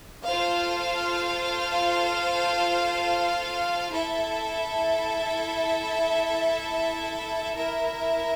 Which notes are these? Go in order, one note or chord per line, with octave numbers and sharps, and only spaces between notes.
F4 A4 C5 F5
E4 A4 E5
E4 A#4 E5